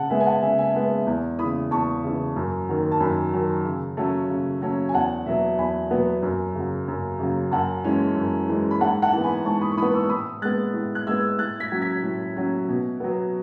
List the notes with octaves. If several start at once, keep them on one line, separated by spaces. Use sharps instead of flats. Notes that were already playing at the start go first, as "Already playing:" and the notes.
Already playing: C#3 F#5 A5
G#3 B3 E5 G#5
G#5
F#5 A5
C#3 E5 G#5
E5 G#5
G#3 B3 E5
E5
E2
E3 B5 D#6
C#3
E2 A5 C#6
C#3 E3
F#2
D#3 F#3
A5
F#2 G#5 B5
D#3 F#3
C#3
F#3 A3 C#4
C#3
F#3 A3 C#4
G#5
E2 F#5 A5
B2 F#3 B3 E5
E2 G#5 B5
B2 F#3 B3
F#2
C#3 F#3
F#2
C#3 F#3
F#2 F#5 A5
E3 G#3 C#4
F#2
E3 G#3 C#4
B5
G#2 F#5 A5
F#5 A5
E3 B3
G#5 B5
G#2 A5 C#6
B5 D#6
C#6
E3 B3 B5 D#6
C#6 E6
A2 B5 D#6
G#3 B3 F#6 A6
A2
F#6
G#3 B3 E6 G#6
A2 F#6 A6
G#6 B6
F#3 C#4
G#6 B6
A2
F#3 C#4
B2
F#3 B3